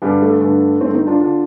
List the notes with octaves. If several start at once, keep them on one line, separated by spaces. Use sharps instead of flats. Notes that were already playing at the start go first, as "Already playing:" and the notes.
G2 D3 G3
A3
G2 D3
G2 D3 A3 C4
C4 D#4
D4 F4
D3 D4 F4